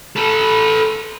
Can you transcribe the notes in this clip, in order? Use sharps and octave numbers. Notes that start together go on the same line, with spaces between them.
A4 B4